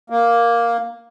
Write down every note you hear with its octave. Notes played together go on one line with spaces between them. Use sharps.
A#3